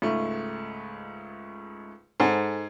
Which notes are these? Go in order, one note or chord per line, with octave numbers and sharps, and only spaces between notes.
C#2 G#2 A3
G#2 A4 C5 F#5 G#5